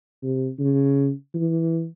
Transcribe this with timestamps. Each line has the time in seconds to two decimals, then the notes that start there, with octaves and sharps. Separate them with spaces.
0.23 C3
0.59 C#3
1.34 E3